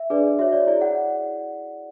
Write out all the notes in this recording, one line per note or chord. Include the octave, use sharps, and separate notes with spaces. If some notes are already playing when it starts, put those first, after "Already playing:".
Already playing: E5
D4 G#4 B4 D5
F#4 C#5 E5
D5
E4 G#4 D5
F#5